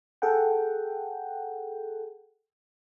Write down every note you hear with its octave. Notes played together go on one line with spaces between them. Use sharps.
G#4 A4 F#5 G5